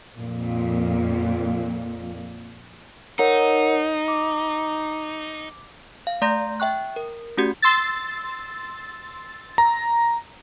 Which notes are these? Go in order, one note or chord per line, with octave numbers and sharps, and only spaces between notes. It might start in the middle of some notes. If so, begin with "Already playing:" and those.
F2 A#2
D#4 A#4 C#5 F#5
D6
F5
A3 D5 A#5 C6 G6 A#6
E5 G5 C#6 F#6
A#4
A3 C#4 F#4 G4
C6 E6 A6
A#5